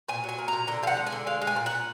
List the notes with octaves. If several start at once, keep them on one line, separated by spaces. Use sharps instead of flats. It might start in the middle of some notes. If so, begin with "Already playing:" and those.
A#2 G#5
F#3
G#5
A#3
A#5
A#2
D3 A#5
F3 F5 F#5
G#3
G#5
D3
G#3 F5
G#3
G#5
A#2
F#5
A#2